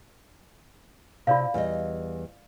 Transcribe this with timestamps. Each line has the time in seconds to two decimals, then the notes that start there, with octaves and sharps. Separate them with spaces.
1.27 C3 F4 D5 F5
1.54 E2 G3 D#5